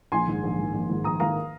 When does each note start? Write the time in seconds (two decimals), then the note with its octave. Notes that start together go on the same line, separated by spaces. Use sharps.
0.12 A#1 G#5 C6
0.27 G#2 D#3
0.43 A#1
0.59 G#2 D#3
0.74 A#1
0.89 G#2 D#3
1.04 A#1 A#5 D#6
1.20 G#2 D#3 F5 A#5